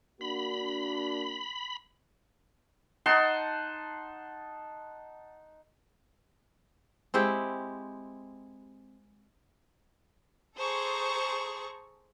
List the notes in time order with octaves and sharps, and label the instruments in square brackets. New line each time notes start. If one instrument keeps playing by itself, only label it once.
[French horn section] A#3 D4 F#4 [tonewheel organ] B5
[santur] D#4 F#5 A5 C6
[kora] G#3 C4 E4 G4
[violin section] G#4 A4 C5 A#5 C#6